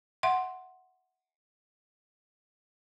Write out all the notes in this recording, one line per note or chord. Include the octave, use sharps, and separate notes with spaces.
E5 F#5 C6